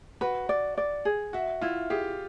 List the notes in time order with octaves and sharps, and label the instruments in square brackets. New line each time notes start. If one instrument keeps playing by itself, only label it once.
[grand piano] F#4 [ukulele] B4
[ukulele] D5
D5
G#4
[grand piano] F#4 [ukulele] E5
[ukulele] E4 [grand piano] F4
[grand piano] G4 [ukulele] G#4